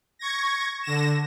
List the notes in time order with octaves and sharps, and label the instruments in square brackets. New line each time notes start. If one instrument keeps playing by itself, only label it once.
[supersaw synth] C#6 G#6 A#6
D3 A#6 E7